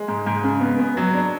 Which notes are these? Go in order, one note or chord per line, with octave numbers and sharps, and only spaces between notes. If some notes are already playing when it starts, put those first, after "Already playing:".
Already playing: G#3
G#2
G#2
C#3
B3
B3
F#3
D4